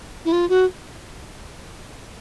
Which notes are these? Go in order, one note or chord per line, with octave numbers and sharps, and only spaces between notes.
E4
F4
F#4